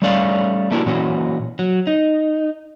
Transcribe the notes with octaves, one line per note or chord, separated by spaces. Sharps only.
G3 A3 C#4 C#5 D5 F5
A3 A#3 D4 E4 F#4 G4
A#2 E3 C#4 F#4
F#3
D#4